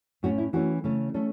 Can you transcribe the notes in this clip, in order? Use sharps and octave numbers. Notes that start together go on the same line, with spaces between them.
A2 A3 C#4 F#4
E4
E3 A3 C#4 F#4
C#3 A3 C#4
A3 C#4 A4